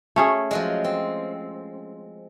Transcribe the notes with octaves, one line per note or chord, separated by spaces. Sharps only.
A3 C#4 G#4
F3 F#3 G#3
C4